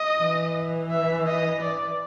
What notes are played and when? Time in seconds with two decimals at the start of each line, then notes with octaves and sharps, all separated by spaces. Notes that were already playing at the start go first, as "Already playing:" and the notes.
Already playing: D#5
0.20 E3
0.91 E5
1.27 D#5
1.61 D5